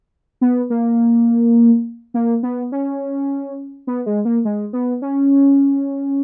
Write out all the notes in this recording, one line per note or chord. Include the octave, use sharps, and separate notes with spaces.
B3
A#3
A#3
B3
C#4
B3
G#3
A#3
G#3
B3
C#4